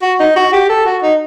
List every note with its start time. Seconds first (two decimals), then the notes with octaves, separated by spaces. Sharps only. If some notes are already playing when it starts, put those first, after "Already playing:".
0.02 F#4
0.20 D#4
0.36 F#4
0.53 G4
0.69 A4
0.86 F#4
1.03 D#4